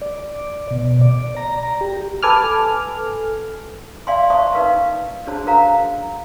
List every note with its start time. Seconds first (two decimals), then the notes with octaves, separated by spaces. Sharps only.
0.01 D5
0.71 B2
1.01 D5
1.37 A#5
1.63 A#5
1.81 G4
2.23 A4 B4 G#5 D6 F6
4.07 D5 E5 F5 G5 G#5 C6
4.30 C5 E5 A5 C6 C#6 D#6
4.53 D#4 A#4 B4 F5 A5
5.27 D4 F#4 G#4 C5 C#5 A5
5.47 A#4 C5 F5 F#5 A#5